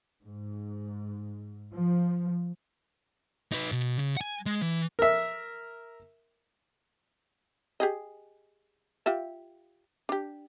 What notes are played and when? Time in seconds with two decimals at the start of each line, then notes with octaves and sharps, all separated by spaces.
0.22 G#2
1.74 F3
3.52 D#4 B4
3.72 B2
3.98 C#3
4.17 F#5 G#5
4.46 G#3
4.62 E3
4.99 A#4 E5
7.80 G4 G#4 D#5
9.06 F4 G4 E5
10.09 D4 G4